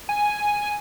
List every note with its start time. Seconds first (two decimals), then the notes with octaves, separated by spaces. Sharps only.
0.09 G#5